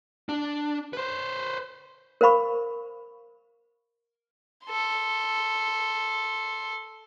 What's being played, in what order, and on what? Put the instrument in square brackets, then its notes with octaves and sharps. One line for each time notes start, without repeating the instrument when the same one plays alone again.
[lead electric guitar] D4
B4 C5
[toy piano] A#4 C5 F5 B5 C#6
[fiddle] A4 C6